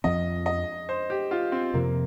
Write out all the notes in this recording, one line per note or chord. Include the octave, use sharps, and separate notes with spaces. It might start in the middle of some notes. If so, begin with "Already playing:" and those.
F2 F3 C4 D#5
D#5
C5
G4
F4
C4
F2 C3 F3 A#3